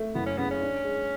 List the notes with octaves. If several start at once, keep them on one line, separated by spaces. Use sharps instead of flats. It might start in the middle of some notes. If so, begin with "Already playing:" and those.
Already playing: A3
F#1 B3
C#4
C#3 B3
C#4
D4
G#3